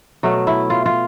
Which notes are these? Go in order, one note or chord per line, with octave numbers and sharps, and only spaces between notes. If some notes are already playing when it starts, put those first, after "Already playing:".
B2 F#3 A3
E4
F4
F4